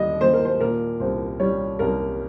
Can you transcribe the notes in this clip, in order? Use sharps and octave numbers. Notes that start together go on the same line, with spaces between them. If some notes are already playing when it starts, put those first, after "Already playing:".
Already playing: D#2 G3 D#5
D#2 C5
A#4
C5
A#2 A#4
C2 C5
G3 C#5
C2 A#4